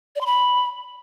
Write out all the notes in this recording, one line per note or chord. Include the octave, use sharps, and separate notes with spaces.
D5
C6
B5